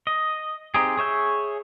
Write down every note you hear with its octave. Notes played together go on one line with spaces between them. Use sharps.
D#5
C4 D#4 G4 G#4
G#4 C#5 E5 G6